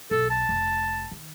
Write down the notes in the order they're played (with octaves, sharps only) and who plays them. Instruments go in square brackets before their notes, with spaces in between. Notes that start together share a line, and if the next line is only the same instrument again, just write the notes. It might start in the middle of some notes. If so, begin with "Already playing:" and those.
[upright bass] B1 [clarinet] A4
[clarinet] A5
[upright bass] F1
D#3